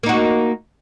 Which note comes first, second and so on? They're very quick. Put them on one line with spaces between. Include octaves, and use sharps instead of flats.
A#3 D#4 F#4